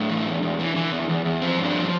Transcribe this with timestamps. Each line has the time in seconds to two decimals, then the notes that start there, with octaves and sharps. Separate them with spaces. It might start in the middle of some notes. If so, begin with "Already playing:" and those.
Already playing: A2 D4
0.10 E3
0.26 E2
0.42 E2
0.59 E3
0.76 E3
0.92 E2
1.09 E2
1.25 E2
1.42 F3 C4
1.58 G2
1.64 D4
1.74 F3